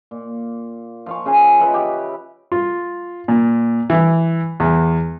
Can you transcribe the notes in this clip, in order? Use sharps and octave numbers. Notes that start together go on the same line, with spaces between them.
A#2
F3 F5 C#6
C#3 G#4 F5 G#5
B4 D#5 E5 B5
G4
F4
A#2
E3
E2